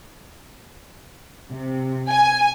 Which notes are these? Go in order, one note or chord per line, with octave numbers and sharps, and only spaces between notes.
C3
G#5